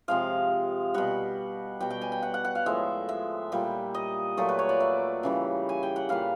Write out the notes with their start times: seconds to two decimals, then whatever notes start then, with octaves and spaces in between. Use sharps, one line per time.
0.08 C3 F3 G#3 F5
0.94 B2 G3 F#5
1.80 B2 G3 G5
1.90 G5
2.01 G#5
2.12 G5
2.23 F#5
2.34 F#5
2.44 F#5
2.55 F5
2.66 A2 F3 G#3 E5
3.09 E5
3.52 A#2 G3
3.94 D#5
4.37 A#2 F#3 A3 D5
4.49 B4
4.59 C#5
4.69 D5
4.80 E5
5.23 C#3 E3 G3
5.69 G#5
5.83 G5
5.96 F#5
6.09 A#2 G3 F5